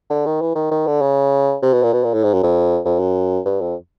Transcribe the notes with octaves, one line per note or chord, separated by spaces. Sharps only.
D3
D#3
E3
D#3
D#3
D3
C#3
C3
B2
A#2
B2
A#2
A2
G#2
F#2
F2
F2
F#2
G2
F2